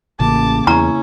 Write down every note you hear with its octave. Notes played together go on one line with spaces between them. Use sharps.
A1 C#3 A#3 A5 D6
E2 C#4 E4 A#5